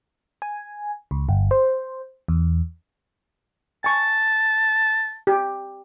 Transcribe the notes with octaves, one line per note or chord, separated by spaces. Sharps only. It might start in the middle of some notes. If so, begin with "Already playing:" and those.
G#5
C#2
G1
C5
E2
G#5 A5 C#6
G4